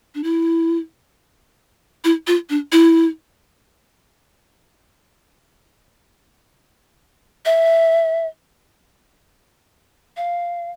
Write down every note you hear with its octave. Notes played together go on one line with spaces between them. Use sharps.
D4
E4
E4
F4
D4
E4
E5
F5